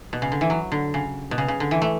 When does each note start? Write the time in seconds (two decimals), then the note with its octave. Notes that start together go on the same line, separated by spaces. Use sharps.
0.13 B2
0.22 C#3
0.32 D3
0.41 E3
0.50 F#3
0.72 D3
0.94 C#3
1.31 B2
1.38 C#3
1.48 C#3
1.60 D3
1.71 E3
1.82 A3